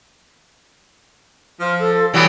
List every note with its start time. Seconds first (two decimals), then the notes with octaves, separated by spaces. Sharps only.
1.60 F3 F6
1.79 A4
2.14 B2 E3 F#3 G3 B3 G#4